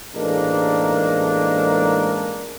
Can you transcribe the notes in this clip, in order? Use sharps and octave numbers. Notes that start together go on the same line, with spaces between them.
A1 G#2 G#3 A#3 D4 A#4